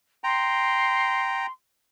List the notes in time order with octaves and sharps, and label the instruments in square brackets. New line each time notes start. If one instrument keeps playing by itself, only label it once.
[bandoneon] G5 A#5 [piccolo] C6